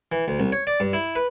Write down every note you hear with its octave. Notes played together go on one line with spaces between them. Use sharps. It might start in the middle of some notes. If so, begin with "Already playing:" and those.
E3
D2
C2
C#5
D5
G2
E4
B4